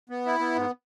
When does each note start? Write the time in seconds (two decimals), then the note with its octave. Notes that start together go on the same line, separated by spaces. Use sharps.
0.09 B3
0.25 E4
0.39 B3
0.55 G#2